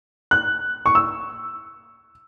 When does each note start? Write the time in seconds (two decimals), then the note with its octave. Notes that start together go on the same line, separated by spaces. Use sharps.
0.31 F#6
0.86 C#6
0.95 E6